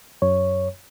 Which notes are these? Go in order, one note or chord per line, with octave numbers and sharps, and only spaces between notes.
F#2 C#5